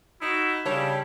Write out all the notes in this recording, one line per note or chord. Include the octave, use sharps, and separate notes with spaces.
D#4 E4 F#4
C#3 G3 D4 E4 C#5